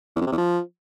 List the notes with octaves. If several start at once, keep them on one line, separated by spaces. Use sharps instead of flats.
E2
F2
C3
E2
F3